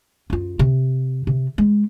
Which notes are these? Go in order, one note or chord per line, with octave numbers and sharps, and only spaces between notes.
F#2 F4
C3
C3
G#3